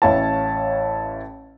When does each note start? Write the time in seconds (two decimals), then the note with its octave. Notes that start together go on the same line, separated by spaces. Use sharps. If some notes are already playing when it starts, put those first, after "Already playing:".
0.02 A1 E4 C#5 F5 A5